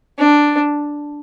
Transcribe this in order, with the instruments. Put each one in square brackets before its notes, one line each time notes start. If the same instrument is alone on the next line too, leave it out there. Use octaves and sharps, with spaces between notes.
[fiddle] D4